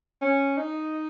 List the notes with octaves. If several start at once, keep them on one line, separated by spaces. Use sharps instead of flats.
C#4
D#4